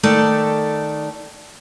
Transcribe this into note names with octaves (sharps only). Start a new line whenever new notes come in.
D#3 A3 A4 D5